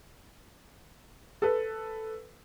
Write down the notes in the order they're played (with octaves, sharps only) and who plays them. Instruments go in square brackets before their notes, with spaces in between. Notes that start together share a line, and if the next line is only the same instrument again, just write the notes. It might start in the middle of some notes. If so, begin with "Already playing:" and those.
[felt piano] A4 B4